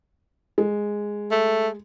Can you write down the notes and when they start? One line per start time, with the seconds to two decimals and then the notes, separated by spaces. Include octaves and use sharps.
0.58 G#3
1.31 A3